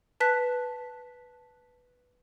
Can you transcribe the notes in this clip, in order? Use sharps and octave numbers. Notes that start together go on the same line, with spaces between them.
B4 A5 F#6 B6